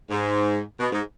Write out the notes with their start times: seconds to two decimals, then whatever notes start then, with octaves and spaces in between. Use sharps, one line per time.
0.10 G#2
0.80 B2
0.93 G#2